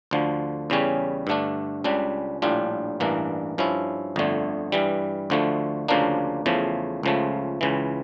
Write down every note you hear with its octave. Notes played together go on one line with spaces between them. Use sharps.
D2 D3 F3
E2 C#3 G3 C#4
G2 D3 A3 D4
C#2 C#3 G3 D4
A#1 A2 G3 D4 F4
A1 G2 E3 A#3 D4
G2 F3 C#4 E4
G1 F2 D3 A3
G2 E3 G3
D2 D3 F3 A3
D2 C#3 F3 A#3 D4
E2 C#3 F3 A3
C#2 C#3 F3 A3
C#2 C#3 E3